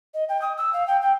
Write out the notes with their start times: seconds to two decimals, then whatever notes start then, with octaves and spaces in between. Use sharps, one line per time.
0.14 D#5
0.29 G5
0.41 D#6
0.57 E6
0.73 F5
0.87 G5
1.01 G5